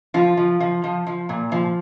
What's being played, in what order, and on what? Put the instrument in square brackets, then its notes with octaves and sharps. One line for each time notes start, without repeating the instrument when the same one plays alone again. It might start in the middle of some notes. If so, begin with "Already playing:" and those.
[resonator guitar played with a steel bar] F3 F4
F3
F3
F3
F3
A#2
F3